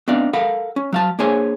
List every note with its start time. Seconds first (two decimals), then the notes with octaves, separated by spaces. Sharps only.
0.08 B3 C4 D4 D#4 D5 F5
0.33 A4 A#4 F5 F#5 B5
0.76 C#4
0.92 F#3 F5 A5
1.19 A#3 D4 G#4 C5 C#5 G#5